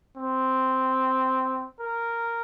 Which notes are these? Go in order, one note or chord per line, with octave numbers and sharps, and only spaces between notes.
C4
A#4